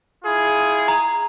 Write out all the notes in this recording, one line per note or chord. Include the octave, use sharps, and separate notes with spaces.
E4 F4 G#4
A#5